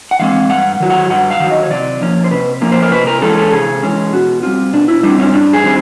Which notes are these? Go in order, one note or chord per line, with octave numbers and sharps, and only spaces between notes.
F#5
E3 G#3 C4 F5
G2 F#5
D#3 F#3
F#5
G2 F#5
F5
D#3 F#3
D#5
C#5
C3 D5
F3 A#3 C#4
C5
C3 B4
F3 A#3 C#4
C5
A#4
C3 B4
A#4
E3 G#3 C#4 A4
A4
C3 G#4
E3 G#3 C#4
B2 F#4
G3 C4 F4
B2 D4
E4
G3 C4 D4
C#4
G2 D4
G#4
D#3 G3 C4